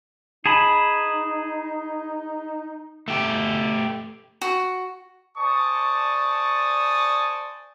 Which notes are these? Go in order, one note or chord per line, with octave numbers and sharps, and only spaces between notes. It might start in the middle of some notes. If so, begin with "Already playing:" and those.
D#4 G#4 A5 B5
A3 G4
F#4
C5 D5 G#5 A5 C#6 D#6